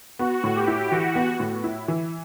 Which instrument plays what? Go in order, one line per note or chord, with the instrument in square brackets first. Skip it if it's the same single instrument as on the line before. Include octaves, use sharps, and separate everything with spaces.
[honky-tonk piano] B3 [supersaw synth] F#4
[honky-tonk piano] A2
[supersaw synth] G4
[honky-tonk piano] E4
[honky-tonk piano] E3 [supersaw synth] F#4
[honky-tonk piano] B3
A2
E4
E3